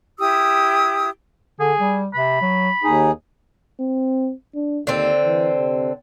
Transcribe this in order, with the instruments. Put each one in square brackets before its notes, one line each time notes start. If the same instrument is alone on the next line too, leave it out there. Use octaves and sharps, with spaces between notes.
[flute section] E4 G4 D#6 E6
[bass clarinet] D3 [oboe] G#4
[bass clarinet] G3
[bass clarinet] C3 [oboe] B5
[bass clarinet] F#3
[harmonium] D#2 G#4 [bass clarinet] D#4
[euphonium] C4
D4
[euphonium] D#2 [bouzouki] D3 C4
[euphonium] E3
C3